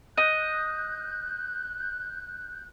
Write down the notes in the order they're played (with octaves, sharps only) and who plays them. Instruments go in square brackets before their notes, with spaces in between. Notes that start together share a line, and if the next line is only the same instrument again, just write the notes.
[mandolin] D#5 [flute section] F#6 G6